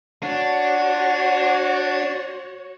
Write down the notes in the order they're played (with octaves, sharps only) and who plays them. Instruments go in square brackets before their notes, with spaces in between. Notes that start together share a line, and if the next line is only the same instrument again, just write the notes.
[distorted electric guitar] D4 [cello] F#4 C#5 [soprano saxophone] F#5